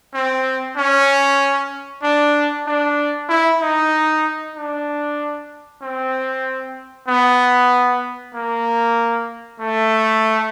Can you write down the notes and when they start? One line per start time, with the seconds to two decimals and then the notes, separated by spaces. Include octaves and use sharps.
0.14 C4
0.77 C#4
2.03 D4
2.66 D4
3.29 E4
3.61 D#4
4.56 D4
5.82 C4
7.08 B3
8.35 A#3
9.60 A3